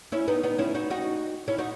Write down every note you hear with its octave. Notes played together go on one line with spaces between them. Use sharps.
C#4 E4
B3 D#4
B3 D#4
C#4 E4
D#4 F#4
D#4 F#4
C#4 E4
D#4 F#4